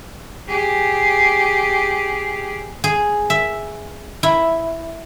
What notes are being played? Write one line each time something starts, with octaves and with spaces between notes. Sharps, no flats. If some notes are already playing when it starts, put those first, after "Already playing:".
G4 G#4
G#4
E5
E4